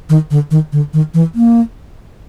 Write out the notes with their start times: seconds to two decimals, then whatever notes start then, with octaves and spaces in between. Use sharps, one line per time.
0.10 D#3
0.31 D3
0.51 D#3
0.72 D3
0.94 D#3
1.14 E3
1.35 A#3